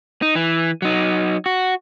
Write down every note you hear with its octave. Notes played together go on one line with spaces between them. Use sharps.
D#4
E3
F#3 D#4
F#4